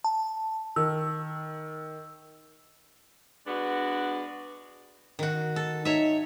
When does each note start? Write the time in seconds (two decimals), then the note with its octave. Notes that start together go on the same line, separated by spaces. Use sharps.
0.04 A5
0.76 D#3 E6
3.47 G#3 B3 D4 F#4
5.19 D#3 F#4
5.56 A4
5.85 D#4 C#5 E5